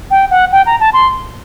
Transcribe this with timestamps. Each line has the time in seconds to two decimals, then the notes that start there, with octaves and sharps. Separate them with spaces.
0.11 G5
0.31 F#5
0.52 G5
0.66 A#5
0.80 A5
0.93 C6